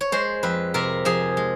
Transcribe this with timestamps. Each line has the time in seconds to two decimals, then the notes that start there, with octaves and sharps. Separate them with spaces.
0.01 C#5
0.12 G#3 C5
0.43 F2 B4
0.74 C3 A#4
1.05 F3 G#4
1.37 G#3